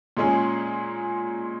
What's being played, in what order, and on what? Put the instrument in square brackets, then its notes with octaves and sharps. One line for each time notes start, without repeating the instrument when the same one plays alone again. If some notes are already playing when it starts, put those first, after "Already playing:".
[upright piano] A#2 G#3 C#4 G#4